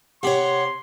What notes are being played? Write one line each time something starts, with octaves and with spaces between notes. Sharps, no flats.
C3 G4 C#5 F#5 B5 C6